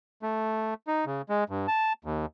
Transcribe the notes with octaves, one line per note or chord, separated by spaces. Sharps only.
A3
D#4
C#3
G#3
G2
A5
D#2